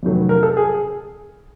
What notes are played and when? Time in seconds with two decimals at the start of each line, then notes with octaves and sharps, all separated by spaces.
0.03 F2 C3 D#3 F#3 A3
0.16 B4
0.29 A#4
0.43 A4
0.57 G#4
0.70 G#4